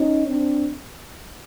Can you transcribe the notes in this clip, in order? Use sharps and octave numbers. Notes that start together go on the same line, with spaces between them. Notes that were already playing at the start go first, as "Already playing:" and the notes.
Already playing: C#4 D#4
C4 D4